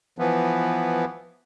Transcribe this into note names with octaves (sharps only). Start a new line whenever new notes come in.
E3 F3 B3